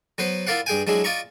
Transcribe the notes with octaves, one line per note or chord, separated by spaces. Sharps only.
F#3 B3 B4 C5
E4 F4 A#4 D5 F5 F#5
G2 G#4 G5 G#5
F#3 G#3 D4 E4 G#4
F4 D5 D#5 A#5 C#6